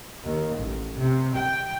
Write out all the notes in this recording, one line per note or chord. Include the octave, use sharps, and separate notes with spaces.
D#2
A1
C3
G5